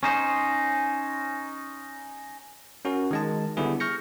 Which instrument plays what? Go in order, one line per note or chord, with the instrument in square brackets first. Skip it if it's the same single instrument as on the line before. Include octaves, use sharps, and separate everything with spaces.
[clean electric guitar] C#4 D#4 C5
[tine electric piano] C#4 F#4 A#4
D#3 G#3 A5
D3 G3 B3 E4 G#4
C#6 F6 G6 A#6 C#7